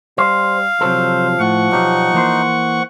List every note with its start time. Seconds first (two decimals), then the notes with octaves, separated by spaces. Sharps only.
0.18 G3 C5 F5
0.81 C3 F3 F#3 A4 C5
1.39 A2 F#5 C#6
1.72 B2 F#3 G3 D#4
2.14 E3 A#3 C5